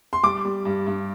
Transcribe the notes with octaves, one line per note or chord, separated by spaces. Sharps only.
C6
G3 D6
G3
G2
G2